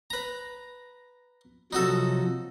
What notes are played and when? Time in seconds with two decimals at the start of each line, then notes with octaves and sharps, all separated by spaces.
0.10 B4 A#5
1.73 C3 F3 F#3 D#4 F#4 A4